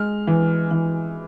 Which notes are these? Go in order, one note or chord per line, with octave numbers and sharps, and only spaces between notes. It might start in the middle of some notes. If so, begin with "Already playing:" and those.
Already playing: G#3 F6
E3
E3